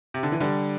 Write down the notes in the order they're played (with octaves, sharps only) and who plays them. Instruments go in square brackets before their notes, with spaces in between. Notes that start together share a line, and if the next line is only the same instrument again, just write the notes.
[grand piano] C3
D3
E3
D3 G3